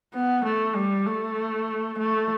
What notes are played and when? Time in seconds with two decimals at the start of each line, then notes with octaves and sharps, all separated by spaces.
0.15 B3
0.45 A3
0.76 G3
1.07 A3
1.99 A3